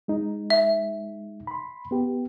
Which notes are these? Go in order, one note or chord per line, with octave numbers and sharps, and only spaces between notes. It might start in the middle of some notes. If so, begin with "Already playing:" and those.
G#3 D#4
E5
B5 C6
B3 G4